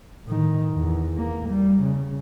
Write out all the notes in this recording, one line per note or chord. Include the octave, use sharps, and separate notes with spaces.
A2 D#3
E2
A#3
G3
C#3